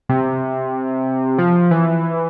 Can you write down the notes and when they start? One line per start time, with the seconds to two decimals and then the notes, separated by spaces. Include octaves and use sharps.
0.09 C3
1.38 F3
1.71 E3